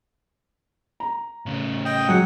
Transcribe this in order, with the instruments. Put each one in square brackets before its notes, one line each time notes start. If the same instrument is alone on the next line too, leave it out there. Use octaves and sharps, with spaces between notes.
[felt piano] A#5
[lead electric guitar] A2 C#3
[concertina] D#5 G5
[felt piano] F#3 [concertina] G#4 F#5